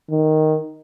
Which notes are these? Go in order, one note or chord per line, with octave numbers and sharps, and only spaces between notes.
D#3